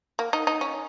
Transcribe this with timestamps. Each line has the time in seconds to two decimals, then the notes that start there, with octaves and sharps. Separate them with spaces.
0.19 A#3
0.33 D#4
0.47 D#4
0.61 C#4